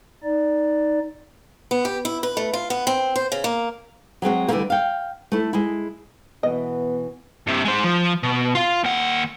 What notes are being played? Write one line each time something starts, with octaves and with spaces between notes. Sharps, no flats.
D#4 D5
B3
G4
E4
B4
A3
F4
B3
C4
C5
C#3
A#3
F#3 G#3 C4 F#4
D3 E3 F3 G3 A3 A#3
F5 G5
A3 E4
G#3 E4
B2 E3 B3 D#5
G2 C3
G#3 C5
F3
B2
F4 F5
D#2 F#5